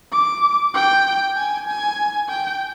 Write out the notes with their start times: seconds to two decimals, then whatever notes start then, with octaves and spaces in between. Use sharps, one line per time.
0.12 D6
0.74 G5
1.36 G#5
1.67 G#5
2.29 G5